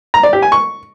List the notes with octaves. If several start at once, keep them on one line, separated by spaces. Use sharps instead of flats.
A#5
D5
G4
G#5
C#6